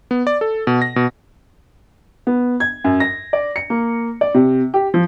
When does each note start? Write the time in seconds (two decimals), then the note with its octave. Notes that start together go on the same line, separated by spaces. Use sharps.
0.11 B3
0.27 D5
0.41 A4
0.67 B2
0.82 A#6
0.96 B2
2.27 B3
2.60 G#6
2.84 F#2
3.00 A#6
3.33 D5
3.56 C#7
3.70 A#3
4.21 D5
4.34 C3
4.74 G4
4.94 F3